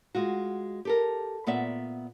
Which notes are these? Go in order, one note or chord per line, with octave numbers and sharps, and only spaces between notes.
G#3 F4 F#4
G4 A4 A#4
A#2 B3 D5 E5